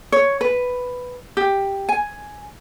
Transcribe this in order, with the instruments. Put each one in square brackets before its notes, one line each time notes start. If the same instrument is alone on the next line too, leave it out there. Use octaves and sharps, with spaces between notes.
[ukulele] C#5
B4
G4
G#5